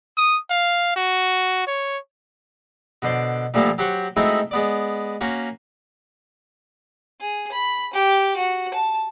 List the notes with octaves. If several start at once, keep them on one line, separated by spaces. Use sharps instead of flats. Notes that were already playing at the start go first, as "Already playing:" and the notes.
D#6
F5
F#4
C#5
B2 D3 C5 D5 C6
A#2 D3 F3 G3 A3 A#3
F#3 G4 C5 F#5 C#6
G#3 A3 C4 D#4 E4 F#4
G#3 B3 D5
A#3 C#4 F#4
G#4
B5
G4
F#4
A5